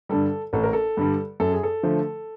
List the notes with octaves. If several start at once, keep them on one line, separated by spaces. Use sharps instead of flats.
G2 D3 G3 A4
A1 A4
A#4
A4
G2 D3 G3
F#2 A4
G#4
A4
D3 F3 A3